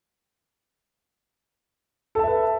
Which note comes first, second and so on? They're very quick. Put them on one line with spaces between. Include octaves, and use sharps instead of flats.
A4 A5 E5 B4